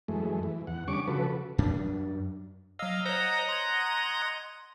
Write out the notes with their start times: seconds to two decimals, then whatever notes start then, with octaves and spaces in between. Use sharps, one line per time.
0.08 F#2 E3 G#3 A3
0.43 E3
0.67 E2 F#5
0.88 D3 G3 C#4 C#6 D6
1.08 C#3 F3 F#4 A4 B4
1.58 F#2 D4
2.79 F#3 D#5 F5 E6
3.06 C5 C#5 D#5 F#5 A#5
3.49 C6 G#6